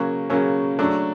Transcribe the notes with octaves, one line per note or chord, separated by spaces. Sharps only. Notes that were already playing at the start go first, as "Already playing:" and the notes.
Already playing: C#3 F#3 A#3 C#4
C#3 F#3 A#3 C#4
F#3 A3 D4